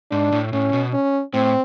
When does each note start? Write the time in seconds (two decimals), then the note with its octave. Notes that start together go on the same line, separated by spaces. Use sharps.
0.11 G#2 D4
0.32 A2
0.53 A2 C#4
0.73 B2
0.93 C#4
1.34 A2 C4